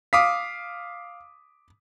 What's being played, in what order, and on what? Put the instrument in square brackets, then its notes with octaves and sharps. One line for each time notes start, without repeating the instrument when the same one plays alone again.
[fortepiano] F5 [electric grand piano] D6 D#6 B6